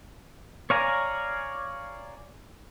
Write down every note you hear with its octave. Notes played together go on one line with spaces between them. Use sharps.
C#5 D5 F5 G#5 A#5